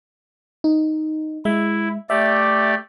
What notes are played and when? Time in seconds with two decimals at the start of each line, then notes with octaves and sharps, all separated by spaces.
0.64 D#4
1.45 G#3 E4 E5
2.10 A3 G4 D5 E5